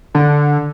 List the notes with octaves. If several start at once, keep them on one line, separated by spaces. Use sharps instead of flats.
D3